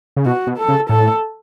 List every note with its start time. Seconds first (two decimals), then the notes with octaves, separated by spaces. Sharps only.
0.16 C#3
0.26 B2 F#4
0.47 B2
0.58 A4
0.68 C#3
0.89 A2 A4